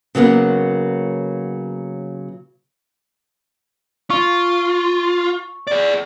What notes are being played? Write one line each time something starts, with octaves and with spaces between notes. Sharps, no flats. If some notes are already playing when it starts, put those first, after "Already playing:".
C#3 F#3 A#3 B3
F4 C#6
G#4 D5